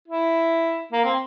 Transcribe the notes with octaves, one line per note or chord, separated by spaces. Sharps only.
E4
A#3
C4